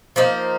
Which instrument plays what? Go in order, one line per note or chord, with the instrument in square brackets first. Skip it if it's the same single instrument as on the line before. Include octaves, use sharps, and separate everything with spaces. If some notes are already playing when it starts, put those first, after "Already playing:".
[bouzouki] F3 A#3 D#4